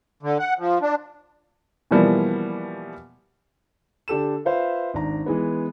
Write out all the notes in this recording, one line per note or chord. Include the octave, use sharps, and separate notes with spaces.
D3
F#5
F3
D4
B2 E3 F3 G3 A#3 B3
D3 G4 A4 E7
F4 B4 C5 E5 F5
G#1 D4 A#5
E3 G#3 B3